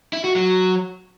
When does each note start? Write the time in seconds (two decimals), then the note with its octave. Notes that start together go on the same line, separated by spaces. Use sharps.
0.13 E4
0.24 F#4
0.36 F#3